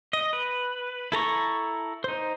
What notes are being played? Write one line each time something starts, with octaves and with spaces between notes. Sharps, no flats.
D#5
B4
E4 A4 A#5 C#6
D#4 C5